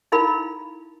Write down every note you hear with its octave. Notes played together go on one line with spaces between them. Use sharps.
D#4 E4 A#4 F5 B5